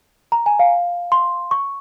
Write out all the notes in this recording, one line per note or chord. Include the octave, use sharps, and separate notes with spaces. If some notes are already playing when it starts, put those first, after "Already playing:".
A#5
G#5
F5
C6
C#6